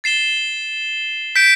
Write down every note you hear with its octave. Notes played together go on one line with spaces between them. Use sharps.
A6 C7 E7 G7
G6 B6 D7